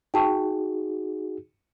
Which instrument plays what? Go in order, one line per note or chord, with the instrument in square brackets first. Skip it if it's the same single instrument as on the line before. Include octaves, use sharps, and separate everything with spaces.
[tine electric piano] D#4 F#4 G#4 [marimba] G5 A5 C#6